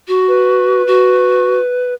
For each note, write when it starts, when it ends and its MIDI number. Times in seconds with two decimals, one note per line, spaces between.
0.08 0.82 66
0.28 1.94 71
0.87 1.58 66